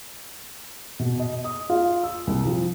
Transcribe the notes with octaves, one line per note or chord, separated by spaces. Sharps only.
B2
D#5
D#6
F4
E6
C2
F3